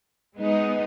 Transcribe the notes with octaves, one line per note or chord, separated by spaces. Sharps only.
G#3 B3 D#4